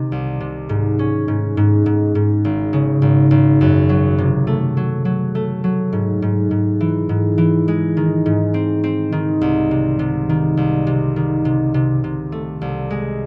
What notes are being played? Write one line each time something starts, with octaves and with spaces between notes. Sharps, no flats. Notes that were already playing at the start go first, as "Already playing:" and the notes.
Already playing: C3 D#3
C2
C3
G#2
C#4
G#2
G#2
G#2
G#2
G#1
C#3
G#1
G#1
F#2
F#3
C3
A3
F#3
F#3
A3
F#3
G#2
G#2
G#2
E3
G#2
E3
G#3
D#3
G#2
C4
C4
D#3
C2
C3
C3
D#3
C2
C3
D#3
C3
C3
C3
A3
C2
G#3